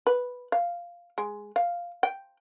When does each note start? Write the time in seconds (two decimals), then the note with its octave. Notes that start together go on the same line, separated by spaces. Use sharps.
0.07 B4
0.52 F5
1.18 G#3
1.56 F5
2.03 G5